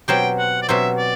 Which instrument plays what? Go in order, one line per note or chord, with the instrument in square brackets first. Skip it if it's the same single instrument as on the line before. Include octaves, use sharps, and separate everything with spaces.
[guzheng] B2 F#3 C4 G4 C5 [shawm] G5
[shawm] F#5
D5
[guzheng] B2 F#3 C4 G4 C5 [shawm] E5
[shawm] D5